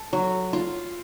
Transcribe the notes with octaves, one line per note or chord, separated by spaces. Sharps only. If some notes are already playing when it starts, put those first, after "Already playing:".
Already playing: A4
F#3
F4